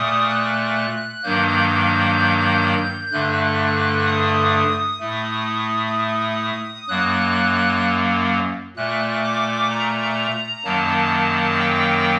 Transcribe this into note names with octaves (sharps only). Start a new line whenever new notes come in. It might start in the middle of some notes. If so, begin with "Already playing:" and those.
Already playing: A#2 A3 D#6
F#6
G2 D#3 F#3 A#3 G6
G2 D3 A3 F#6
D#6
A2 A3
F#2 F#3 A#3 F#6
A#2 A3 F#6
D6
A#5
F#2 D#3 F#3 A#3 A5
G5